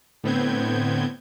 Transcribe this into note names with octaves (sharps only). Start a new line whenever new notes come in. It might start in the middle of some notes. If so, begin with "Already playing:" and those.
A2 D3 B3 C4 G6 G#6